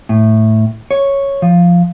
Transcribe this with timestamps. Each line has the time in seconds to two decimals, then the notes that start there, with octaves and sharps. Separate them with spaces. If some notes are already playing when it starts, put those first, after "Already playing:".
0.09 A2
0.91 C#5
1.42 F3